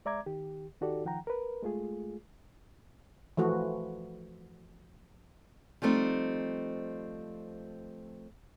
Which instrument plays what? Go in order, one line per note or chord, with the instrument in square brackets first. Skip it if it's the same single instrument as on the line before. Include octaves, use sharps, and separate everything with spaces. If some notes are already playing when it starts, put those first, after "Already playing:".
[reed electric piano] G#3 D5 E5 A#5 D6 G#6
D#3 G4
D#3 D#4 F#4 G4 A4 D5
D#3 F3 F#5 G5 A#5
A#4 B4
G#3 A3 F4 G#4
[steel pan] E3 F3 A3 F#4
[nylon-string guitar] F3 G3 A3 C4 D#4